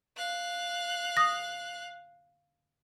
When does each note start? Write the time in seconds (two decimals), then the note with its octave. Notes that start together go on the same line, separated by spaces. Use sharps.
0.16 F5 F#6
1.17 D#6 A#6